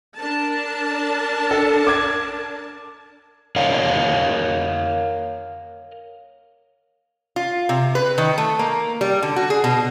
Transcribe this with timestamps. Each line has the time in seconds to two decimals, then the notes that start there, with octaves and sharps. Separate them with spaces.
0.17 D4 A#4 A5
1.51 A4
1.87 D6 G#6
3.56 A#4 C#5 D#5 F5 F#5
7.36 F4
7.69 C3
7.95 B4
8.18 D#3
8.38 A3
8.59 A#3
9.01 G3
9.23 D3
9.36 F#4
9.50 G#4
9.64 B2